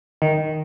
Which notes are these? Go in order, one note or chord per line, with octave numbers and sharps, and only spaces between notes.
D#3